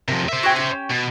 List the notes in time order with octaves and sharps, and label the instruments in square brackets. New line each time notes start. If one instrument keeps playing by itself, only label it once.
[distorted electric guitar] C3 F3 [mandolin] A#4
[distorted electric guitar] C5 E5
[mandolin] F#4 G#4 G5
C#4 F#4 G4
[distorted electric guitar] B2